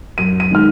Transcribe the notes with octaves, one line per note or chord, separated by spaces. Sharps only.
F#2 D#7
D#7
D#3 G#3 D#4 F6